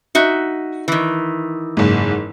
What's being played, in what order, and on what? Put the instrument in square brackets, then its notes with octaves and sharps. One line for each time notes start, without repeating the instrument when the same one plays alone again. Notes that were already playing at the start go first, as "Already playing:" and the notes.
[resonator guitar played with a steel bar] D#4 F#4 E5
D#3 E3
[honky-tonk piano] F#1 G#2